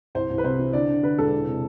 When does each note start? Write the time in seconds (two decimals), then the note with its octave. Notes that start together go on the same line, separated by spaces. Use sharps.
0.15 C2 C5
0.30 C2
0.38 B4
0.44 C3 C5
0.59 E3
0.73 D3 D5
0.89 D3
1.03 D3 B4
1.18 E1 A4
1.32 E3
1.47 C3